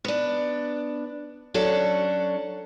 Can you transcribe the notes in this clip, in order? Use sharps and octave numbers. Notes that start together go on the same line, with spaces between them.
B3 D4
F#3 C#4 D4 F#4 A4